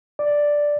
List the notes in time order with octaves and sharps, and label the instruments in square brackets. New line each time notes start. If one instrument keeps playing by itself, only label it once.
[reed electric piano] D5